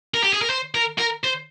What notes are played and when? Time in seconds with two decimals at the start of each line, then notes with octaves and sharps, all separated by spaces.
0.14 A#4
0.23 G4
0.33 G#4
0.42 A#4
0.50 C5
0.75 A#4
0.98 A#4
1.23 C5